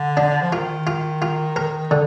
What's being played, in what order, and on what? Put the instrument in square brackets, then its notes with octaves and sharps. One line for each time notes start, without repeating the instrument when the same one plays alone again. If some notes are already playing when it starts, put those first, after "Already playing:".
Already playing: [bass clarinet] D3
[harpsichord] D4
[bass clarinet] F3
[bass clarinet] D#3 [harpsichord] F4
[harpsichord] F4
F4
A#4
D3